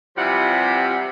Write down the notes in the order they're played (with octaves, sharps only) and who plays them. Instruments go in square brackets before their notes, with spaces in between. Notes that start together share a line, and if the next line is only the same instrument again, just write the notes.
[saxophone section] C3 E3 F3 G3 E4 F#5